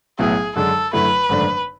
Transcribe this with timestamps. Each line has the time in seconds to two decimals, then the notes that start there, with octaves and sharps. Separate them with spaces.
0.19 B1 A2 F#3 B3 E4 G#4
0.55 F#2 D3 G#3 D4 A4
0.93 F#2 D3 A3 E4 B4
1.29 G#1 F#2 D3 A3 D4